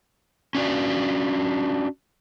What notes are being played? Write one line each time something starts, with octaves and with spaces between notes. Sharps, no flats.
C#4 D4 F#4 D5